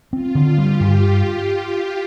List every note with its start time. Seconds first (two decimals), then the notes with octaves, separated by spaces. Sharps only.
0.13 C4 F4
0.35 D3
0.58 G3 G4
0.80 G2